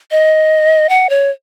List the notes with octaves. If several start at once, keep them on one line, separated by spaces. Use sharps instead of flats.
D#5
F#5
C#5